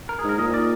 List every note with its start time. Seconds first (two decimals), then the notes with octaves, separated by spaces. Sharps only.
0.09 A#4
0.19 G#4
0.24 G#2
0.29 A#4
0.38 A#2 D#5
0.54 D5